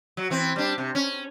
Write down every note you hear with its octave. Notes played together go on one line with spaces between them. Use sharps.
F#3
E3 C4
G3 D4
C3
C#4